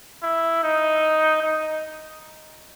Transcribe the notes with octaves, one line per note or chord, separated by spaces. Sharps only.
E4
D#4
D#4